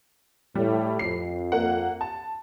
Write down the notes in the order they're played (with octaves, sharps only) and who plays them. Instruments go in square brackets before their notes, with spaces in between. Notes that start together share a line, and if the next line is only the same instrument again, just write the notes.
[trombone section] A2 [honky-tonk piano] G3
[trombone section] F2 [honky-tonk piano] C7
[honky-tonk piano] A#3 F#5
A5